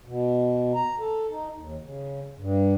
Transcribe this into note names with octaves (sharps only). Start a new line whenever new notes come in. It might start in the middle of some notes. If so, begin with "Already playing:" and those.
B2
A#5
A4
D#4
D#2
C#3
G2